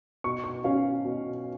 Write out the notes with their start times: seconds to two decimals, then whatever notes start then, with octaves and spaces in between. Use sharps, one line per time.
0.24 B2 C#6
0.44 C#6
0.64 C#4 F5
1.05 B2